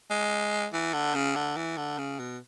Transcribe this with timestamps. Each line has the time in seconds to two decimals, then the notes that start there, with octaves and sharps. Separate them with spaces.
0.11 G#3
0.73 E3
0.94 D3
1.15 C#3
1.36 D3
1.57 E3
1.77 D3
1.98 C#3
2.19 B2